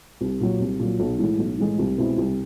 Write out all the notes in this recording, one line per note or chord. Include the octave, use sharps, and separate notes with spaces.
C2
A#2 F#3
C2
A#2 F#3
B1
A2 E3 G#3
B1
A2 E3 G#3
C2
B2 G#3 C4 E4
C2